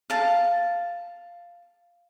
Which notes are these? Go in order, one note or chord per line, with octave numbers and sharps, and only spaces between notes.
F5 A5